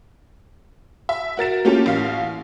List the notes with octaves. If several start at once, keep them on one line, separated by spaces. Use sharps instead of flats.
E5
F#4 A#4 A6 E7
A3 A#3 C#4 F4 G4 A4
A1 F5